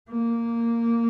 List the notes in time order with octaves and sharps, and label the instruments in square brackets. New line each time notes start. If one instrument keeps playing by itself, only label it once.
[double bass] A#3